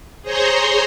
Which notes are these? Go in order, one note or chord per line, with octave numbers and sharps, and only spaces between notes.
G#4 C5 C#5 A#5 C6